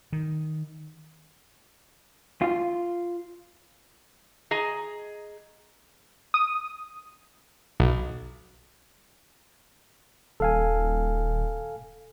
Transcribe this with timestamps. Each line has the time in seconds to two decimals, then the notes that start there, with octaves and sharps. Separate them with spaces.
0.12 D#3
2.42 F4
4.51 G#4 D#5 A#5
6.34 D#6
7.80 B1
10.40 D#1 A4 F5 G#5